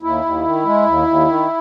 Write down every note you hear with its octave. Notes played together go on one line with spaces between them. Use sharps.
D#2 E4
D#2
D#3
G#3
D#2
D#2
D#3